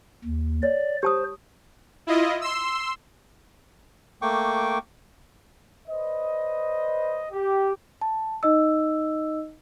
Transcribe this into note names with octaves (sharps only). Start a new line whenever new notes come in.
D#2
C#5 D5
G4 C5 A5 D#6
E4 F4 D#5
C6 E6
A3 A#3 G5 C#6 D6
B4 C5 D5 D#5
G4
A5
D#4 D#5 E6